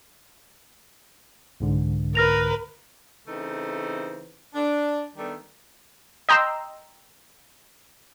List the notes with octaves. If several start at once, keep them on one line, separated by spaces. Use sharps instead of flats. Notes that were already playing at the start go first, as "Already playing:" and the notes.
C2 G#2 D3
A#4 B4 F6 A#6 F7
C#3 E3 A3 C4 D#4
D4
D#3 G3 A3 B3 D4
D#5 G5 A#5 C6 E6